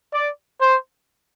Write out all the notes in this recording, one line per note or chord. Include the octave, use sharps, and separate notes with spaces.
D5
C5